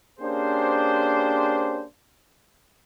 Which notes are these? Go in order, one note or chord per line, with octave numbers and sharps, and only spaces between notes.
A#3 C#4 D4 G4 G#4 C5